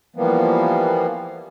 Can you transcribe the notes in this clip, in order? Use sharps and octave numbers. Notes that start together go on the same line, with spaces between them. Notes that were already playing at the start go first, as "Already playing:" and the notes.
E3 F3 G3 A#3 B3